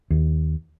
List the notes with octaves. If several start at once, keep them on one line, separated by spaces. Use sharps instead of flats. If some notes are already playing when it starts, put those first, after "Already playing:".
D#2